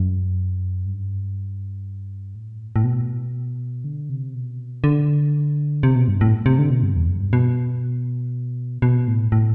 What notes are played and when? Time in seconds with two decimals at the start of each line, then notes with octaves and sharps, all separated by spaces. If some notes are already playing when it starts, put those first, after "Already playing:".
Already playing: F#2
0.86 G2
2.35 A2
2.76 A2
2.84 B2
3.84 D3
4.10 C3
4.34 B2
4.84 D3
5.83 C3
5.95 B2
6.08 G2
6.21 A2
6.46 C3
6.58 D3
6.70 B2
6.83 G2
6.96 E2
7.08 F#2
7.21 G2
7.33 B2
8.82 B2
9.08 A2
9.32 A2